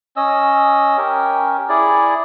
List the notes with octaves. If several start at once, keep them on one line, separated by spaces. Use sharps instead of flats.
C#4 D#5 E6
C#4 G4 A#4
E4 G#4 D5